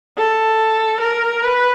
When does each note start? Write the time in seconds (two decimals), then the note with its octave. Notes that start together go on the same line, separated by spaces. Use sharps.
0.18 A4
1.01 A#4
1.43 B4